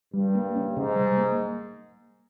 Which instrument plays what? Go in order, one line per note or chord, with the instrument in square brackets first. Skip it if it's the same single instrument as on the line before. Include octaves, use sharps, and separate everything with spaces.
[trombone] G2 [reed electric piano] G3
[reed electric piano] A#3
C#4
[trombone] G#2 [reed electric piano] C3
[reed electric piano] G3
A#3